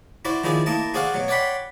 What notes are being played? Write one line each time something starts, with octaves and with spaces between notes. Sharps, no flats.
E4 F#4 C5 D5
D#3 F3 E4 G#4 D5
A#3 E4 D#5 A5
F#4 G#4 C5 D5 F5 F#5
B2 F#3
C#5 D5 F#5 G5 B5 C6